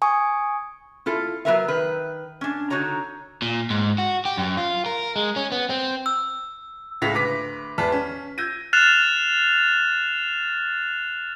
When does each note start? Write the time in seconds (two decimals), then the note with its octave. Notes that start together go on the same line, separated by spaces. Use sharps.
0.02 G#5 C#6 D#6
1.06 E4 F4 A4
1.45 F#3 A#3 B3 A#4 B4 E5
1.68 D#3 B4
2.41 C#4 D4
2.70 D3 D#4 F#4 C#5 A#5
3.42 A#2
3.70 G#2
3.98 F#4
4.25 G4
4.37 F#2
4.57 F4
4.86 A#4
5.16 G#3
5.36 C#4
5.52 B3
5.70 C4
6.06 E6
7.02 C#2 A2 C#3 A#6 B6 F7
7.13 D2 B4 D6 B6
7.78 E2 B4 D5 A5 F6 B6
7.92 C#4
8.38 E6 G6 G#6 A#6 D#7
8.73 F6 F#6 A6 C7 E7 F7